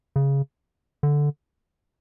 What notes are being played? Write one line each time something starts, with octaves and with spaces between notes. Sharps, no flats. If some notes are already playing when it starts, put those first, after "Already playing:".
C#3
D3